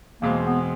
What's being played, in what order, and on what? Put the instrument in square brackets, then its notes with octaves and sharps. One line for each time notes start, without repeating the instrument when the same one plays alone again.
[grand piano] E2 B2 G#3 C4 [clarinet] A#3
[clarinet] B3